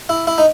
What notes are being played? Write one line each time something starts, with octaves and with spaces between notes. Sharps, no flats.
E4
E4
D#4